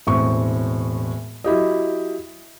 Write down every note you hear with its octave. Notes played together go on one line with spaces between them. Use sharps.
E1 A2 C4 C#6
F#3 E4 G4 D#5